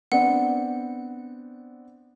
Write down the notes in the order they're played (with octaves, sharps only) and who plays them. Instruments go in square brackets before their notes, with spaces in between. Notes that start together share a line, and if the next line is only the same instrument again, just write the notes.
[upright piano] B3 C4 D4 [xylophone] F#5